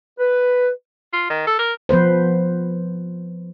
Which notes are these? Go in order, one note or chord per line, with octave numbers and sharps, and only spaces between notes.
B4
F4
D#3
A4
A#4
F3 B3 B4 C5